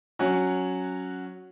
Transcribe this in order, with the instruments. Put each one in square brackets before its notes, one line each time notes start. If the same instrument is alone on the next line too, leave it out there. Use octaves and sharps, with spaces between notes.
[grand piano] F#3 C#4 F#4